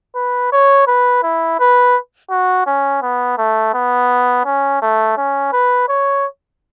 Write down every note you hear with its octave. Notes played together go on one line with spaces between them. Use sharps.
B4
C#5
B4
E4
B4
F#4
C#4
B3
A3
B3
C#4
A3
C#4
B4
C#5